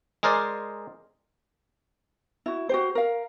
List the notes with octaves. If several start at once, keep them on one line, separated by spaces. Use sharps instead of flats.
G#3 G#4 A#4 C5 D5
E4 F#4
F#4 G4 C5
A#4 F5